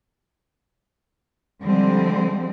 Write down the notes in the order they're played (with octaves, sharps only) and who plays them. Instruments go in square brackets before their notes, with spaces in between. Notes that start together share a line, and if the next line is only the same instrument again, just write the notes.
[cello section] D3 F3 G3 G#3 C4